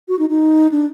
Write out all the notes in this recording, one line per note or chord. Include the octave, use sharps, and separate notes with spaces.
F#4
D#4
D#4
D4